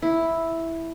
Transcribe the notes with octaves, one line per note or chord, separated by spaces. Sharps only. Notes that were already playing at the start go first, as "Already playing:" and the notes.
E4